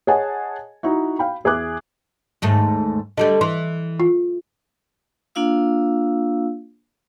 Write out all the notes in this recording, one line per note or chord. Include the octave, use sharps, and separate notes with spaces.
G#4 C#5 D#5 F#5 G#5 A5
D#4 E4 F#4
F5 G5 B5
E2 G#4 E5 D6 F#6
D#2 G#2 A3
D3 G3 A3 D#5
E3 C6
F4
A#3 D4 F4 F5 E6